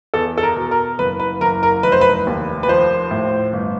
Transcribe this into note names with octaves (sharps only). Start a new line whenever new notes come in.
E2 A4
A4
A#4
B2
A#4
F#1 B4
B4
F#1 A#4
A#4
F1 B4
C5
B4
D#2
B4
F3 C5
A2
G1